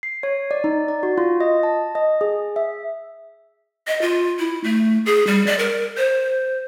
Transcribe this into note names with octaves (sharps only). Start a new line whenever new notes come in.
C7
C#5
D5
D#4
D5
F#4
F4
D#5
A5
D#5
G#4
E5
D#5
F4
E4
A3
G#4
G3
D5
A#4
C5